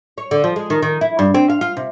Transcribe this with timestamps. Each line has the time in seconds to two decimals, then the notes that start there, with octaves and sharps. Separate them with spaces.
0.18 C#5
0.31 D3
0.44 F3
0.56 G#3
0.70 D#3
0.82 D#3
1.01 E4
1.19 G2
1.35 C4
1.50 F5
1.61 F4
1.77 C3